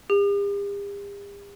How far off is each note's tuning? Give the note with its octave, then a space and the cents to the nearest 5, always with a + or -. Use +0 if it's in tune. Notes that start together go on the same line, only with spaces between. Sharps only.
G4 +45